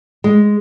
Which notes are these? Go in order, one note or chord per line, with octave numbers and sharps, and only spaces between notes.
G#3